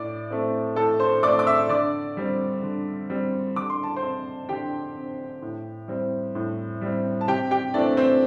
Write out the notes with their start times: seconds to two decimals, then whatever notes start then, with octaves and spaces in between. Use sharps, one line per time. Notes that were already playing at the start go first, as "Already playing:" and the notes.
Already playing: A2 D5 D6
0.31 A3 C4
0.76 A2 A4 A5
1.00 C5 C6
1.23 A3 C4 D5 D6
1.39 D6
1.46 E5 E6
1.69 D3 D5 D6
2.17 G3 C4
2.62 D3
3.10 G3 C4
3.56 D3 D6
3.70 C6
3.83 A5
3.96 C5 C6
4.03 C4
4.49 D3 G4 G5
4.96 C4
5.42 A2
5.88 G3 C4
6.35 A2
6.81 G3 C4
7.21 A5
7.28 C3 G4 G5
7.51 G4 G5
7.74 E3 A3 C4 D4 D5
7.97 C4 C5